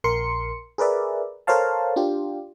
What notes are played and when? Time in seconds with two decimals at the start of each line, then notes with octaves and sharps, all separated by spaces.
0.04 A#1 A#4 C6 C#7
0.78 G#4 A#4 B4 D5 E5
1.47 A4 A#4 C5 C#5 F5 A5
1.96 D4 F4 G4